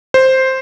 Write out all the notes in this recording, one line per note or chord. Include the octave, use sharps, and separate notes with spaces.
C5